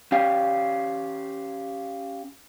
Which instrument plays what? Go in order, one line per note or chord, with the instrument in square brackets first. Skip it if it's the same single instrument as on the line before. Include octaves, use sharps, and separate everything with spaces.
[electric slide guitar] C#4 G4 F5